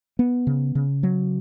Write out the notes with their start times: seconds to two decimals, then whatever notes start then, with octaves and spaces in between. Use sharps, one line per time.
0.19 B3
0.47 C#3
0.75 C#3
1.03 F#3